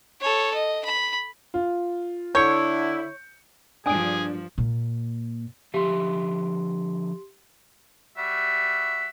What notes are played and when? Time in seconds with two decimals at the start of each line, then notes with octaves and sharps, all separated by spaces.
0.21 A4 C#5
0.54 D#5
0.85 B5
1.54 F4
2.35 D3 E4 C#5 G6 C#7
3.86 G2 F3 D4 G#4 G5 G#5 D#6 D7
4.58 A#2
5.74 D3 F3 G4 E5 C6
8.18 G3 F#4 E5